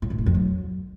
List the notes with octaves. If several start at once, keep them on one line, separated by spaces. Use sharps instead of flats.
A2
B2
A2
F2
F#3